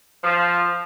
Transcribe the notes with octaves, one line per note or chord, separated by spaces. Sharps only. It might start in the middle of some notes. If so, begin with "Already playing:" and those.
F3